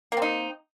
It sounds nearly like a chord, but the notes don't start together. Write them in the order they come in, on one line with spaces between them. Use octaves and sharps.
A#3 C4 D#4